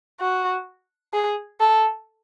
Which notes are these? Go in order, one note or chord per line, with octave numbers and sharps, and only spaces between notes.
F#4
G#4
A4